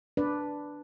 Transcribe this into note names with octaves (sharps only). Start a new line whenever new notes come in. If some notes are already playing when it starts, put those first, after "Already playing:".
D4 B4 D5